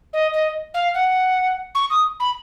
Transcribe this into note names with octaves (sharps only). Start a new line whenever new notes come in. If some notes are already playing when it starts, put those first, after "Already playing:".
D#5
D#5
F5
F#5
C#6
D#6
B5